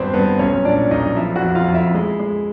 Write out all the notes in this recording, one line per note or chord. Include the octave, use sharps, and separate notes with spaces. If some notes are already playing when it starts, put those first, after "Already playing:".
Already playing: G#1 G2 B3 C4 B4 C5
G2 B3 B4
B1 C#4 C#5
A#2 D4 D5
B1 D#4 D#5
F3 E4 E5
F#4 F#5
F2
F4 F5
F2
E4 E5
G#3
G#3